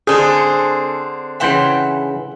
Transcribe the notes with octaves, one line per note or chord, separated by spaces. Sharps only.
D3 C4 G#4 A4 G#5
C#3 E3 E5 F#5 G5 C6